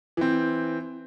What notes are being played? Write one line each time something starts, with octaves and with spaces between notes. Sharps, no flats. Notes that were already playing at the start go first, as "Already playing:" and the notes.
E3 C4